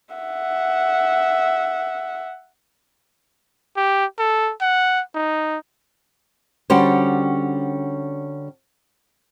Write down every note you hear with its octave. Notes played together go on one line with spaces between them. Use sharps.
E5 F#5
G4
A4
F#5
D#4
D3 G3 C#4 F#4 G4 C5